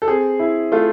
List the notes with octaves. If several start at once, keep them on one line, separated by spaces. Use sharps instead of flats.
A4
C4 G#4
E4
A3 F4